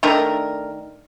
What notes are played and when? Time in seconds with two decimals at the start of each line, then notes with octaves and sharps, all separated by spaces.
0.03 D#3 A3 D4 A#4